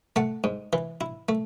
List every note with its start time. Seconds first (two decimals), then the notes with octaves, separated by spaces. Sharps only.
0.16 A3 F#5 A5
0.44 G#2
0.73 E3
1.01 E4
1.29 A3